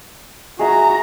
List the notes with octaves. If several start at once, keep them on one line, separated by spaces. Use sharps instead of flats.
F#4 G#4 E5 A#5